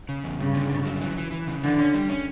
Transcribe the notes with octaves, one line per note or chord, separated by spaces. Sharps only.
C#3
E2
G2 C#3
D3
G2
F#3
E3
E3
E3
C#3
D3 E3
C#4
G3
C#4